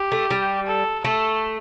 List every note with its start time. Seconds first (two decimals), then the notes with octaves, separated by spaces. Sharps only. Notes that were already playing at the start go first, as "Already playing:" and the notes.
Already playing: G4
0.12 A3
0.30 G3
0.67 A4
1.05 A3 A4